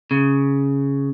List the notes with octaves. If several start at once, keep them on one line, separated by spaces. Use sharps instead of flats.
C#3